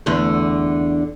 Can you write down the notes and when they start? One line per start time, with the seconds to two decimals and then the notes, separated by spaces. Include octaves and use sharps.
0.06 E2 D3 A3